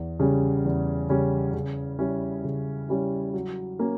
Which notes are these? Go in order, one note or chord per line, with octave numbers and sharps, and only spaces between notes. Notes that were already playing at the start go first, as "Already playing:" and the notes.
Already playing: E2
C#3 G3 C#4
E2
C#3 G3 C#4
C#3
G3 C#4 E4
C#3
G3 C#4 E4
F#3
A#3 C#4